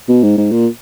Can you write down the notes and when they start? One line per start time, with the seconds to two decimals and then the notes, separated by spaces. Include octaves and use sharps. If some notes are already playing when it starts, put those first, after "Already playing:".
0.08 B2
0.23 G#2
0.38 G#2
0.52 A#2